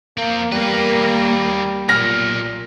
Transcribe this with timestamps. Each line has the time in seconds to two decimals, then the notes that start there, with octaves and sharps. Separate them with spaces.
0.17 F3 A#3 C4
0.52 E2 G3 A#3 B4
0.96 D#2
1.89 B1 A#2 F6 A#6